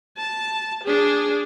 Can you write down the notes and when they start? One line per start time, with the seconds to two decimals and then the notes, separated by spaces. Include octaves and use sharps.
0.18 A5
0.84 D4 G#4